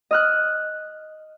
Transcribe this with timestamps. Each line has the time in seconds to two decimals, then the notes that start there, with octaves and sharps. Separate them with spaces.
0.11 D#5 F6 F#6